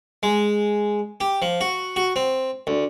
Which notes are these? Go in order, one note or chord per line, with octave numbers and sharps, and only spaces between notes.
G#3
G4
F3
F#4
F#4
C4
D2